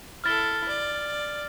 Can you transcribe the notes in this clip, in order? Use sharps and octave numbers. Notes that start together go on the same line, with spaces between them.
E4 A4 F6 A6 G7
D5